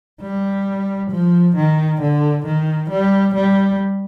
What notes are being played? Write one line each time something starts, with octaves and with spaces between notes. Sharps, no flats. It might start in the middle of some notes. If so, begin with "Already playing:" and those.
G3
F3
D#3
D3
D#3
G3
G3